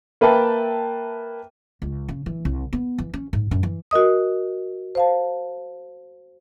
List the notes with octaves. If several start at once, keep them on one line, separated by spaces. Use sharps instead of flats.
A#3 B4 E5 G5 A5
C#2
C#3
E3
C2
B3
E3
C#4
G#2
F#2
E3
F#4 A#4 D#5 D#6
C5 F5 A5